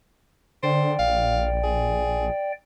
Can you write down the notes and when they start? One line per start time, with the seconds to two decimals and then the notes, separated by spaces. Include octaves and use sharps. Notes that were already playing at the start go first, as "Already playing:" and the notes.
0.63 D3 C5 D5 G5
0.99 A#1 F5
1.64 G#4